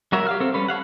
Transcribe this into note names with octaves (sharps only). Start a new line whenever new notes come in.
G3 F#4 A#4 C#5 E5
G4 F5 F6
C4 A4
G3 C#4 B4
A4 C#5 F5 F#5